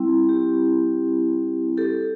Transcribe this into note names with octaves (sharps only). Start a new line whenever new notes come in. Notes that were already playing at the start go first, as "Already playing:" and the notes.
Already playing: G3 C4 E4
G4
G4 A4